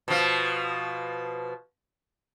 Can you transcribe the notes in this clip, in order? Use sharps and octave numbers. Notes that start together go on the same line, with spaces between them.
B2 F3